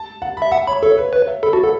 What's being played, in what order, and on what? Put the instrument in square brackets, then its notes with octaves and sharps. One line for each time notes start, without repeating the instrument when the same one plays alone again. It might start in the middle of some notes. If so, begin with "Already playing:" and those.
Already playing: [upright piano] A5
F#5
[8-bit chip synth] E5 [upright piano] B5
[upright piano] E5 [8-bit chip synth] F#5
[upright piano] C#5 [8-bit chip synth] B5
[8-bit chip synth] A4 [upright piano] C#5
[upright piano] B4
[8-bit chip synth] B4 [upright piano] C#5
[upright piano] E5
[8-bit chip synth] A4 [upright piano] B5
[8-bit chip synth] F#4 [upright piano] A5
[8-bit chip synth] A4 [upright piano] F#5